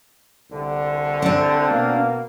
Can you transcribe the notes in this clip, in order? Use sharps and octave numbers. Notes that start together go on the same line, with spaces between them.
C2 D3
C4 D4
B2 A#3